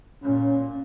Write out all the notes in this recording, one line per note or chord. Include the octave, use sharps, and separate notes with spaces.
A#2 C#4